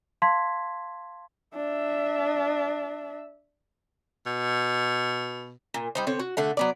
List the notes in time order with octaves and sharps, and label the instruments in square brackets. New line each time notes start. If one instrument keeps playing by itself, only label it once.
[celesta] F5 A5 C6 G#6 B6
[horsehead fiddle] D4 E5
[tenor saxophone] B2
[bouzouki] A#2
G3 D#4 C5
D3 C4 C#5
F#4
D3 A3 F#5
F#3 B3 D5